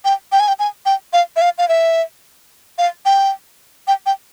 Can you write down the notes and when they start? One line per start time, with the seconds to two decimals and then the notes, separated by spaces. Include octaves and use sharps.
0.05 G5
0.32 G5
0.40 G#5
0.48 G5
0.59 G#5
0.86 G5
1.13 F5
1.36 E5
1.41 F5
1.58 F5
1.69 E5
2.78 F5
3.05 G5
3.87 G5
4.06 G5